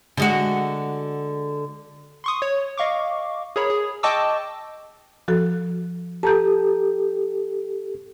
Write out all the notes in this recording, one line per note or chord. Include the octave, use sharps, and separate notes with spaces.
D3 G#3 F#4
C6 C#6 D#6
C#5
D#5 F5 C#6 D6
G#4 A#4 C#5 B5
G#4
D#5 G5 A5 C#6 D6 E6
F3 F#4 A4
G4 A4 A5 A#5 G6